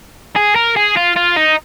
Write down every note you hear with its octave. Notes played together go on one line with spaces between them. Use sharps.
G#4
A#4
G#4
F4
F4
D#4